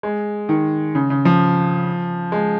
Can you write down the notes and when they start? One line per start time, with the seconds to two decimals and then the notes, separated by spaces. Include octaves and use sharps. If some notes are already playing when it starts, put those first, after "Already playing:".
0.03 G#3
0.49 D#3
0.95 C#3
1.10 C#3
1.25 F3
2.32 G#3